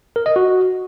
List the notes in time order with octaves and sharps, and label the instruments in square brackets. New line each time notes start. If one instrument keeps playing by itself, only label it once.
[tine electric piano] A#4
D#5
F#4